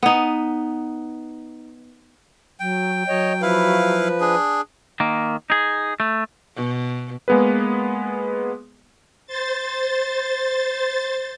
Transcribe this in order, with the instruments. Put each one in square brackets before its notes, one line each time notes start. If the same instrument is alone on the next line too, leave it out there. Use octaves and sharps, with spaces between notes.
[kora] B3 D#4
[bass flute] F#3 [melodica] G5
[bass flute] F#3 [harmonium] C#5 D#5
[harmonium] F3 B4 [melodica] E4 F5
[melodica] D4 G#4
[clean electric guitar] D#3 A#3
D#4 G#4
A3
[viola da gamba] B2
[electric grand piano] G#3 A#3 B3 G#4 B4
[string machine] C5 A6